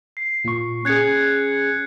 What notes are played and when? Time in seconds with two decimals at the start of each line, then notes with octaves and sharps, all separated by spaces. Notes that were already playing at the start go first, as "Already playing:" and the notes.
0.17 C7
0.45 A#2 C#6
0.85 C#4 G#4 F#6 G#6 C#7